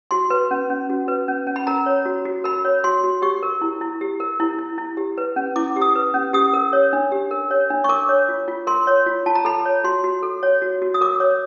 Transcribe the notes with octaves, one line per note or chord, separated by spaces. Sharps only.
F#4 C6
B4
C#4
C#4
F#4
B4
C#4
C#4
B5
A#4 A#5
C#5
F#4
F#4
A#4 B5
C#5
F#4 C6
F#4
G4 C#6
A#4
E4
E4
G4
A#4
E4
E4
E4
G4
B4
C#4
E4 D6
G4
D#6
B4
C#4
G4 D#6
A#4
C#5
D4
G4
A#4
C#5
D4
C#6
A#4 D6
C#5
F4
F4
A#4 C6
C#5
F4
F4 A5
A#5
A4 B5
C#5
F#4 C6
F#4
A4
C#5
F#4
F#4
D#6
A#4 D6
C#5